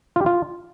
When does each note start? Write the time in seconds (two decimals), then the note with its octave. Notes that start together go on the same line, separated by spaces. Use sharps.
0.16 F4
0.21 G4
0.26 F4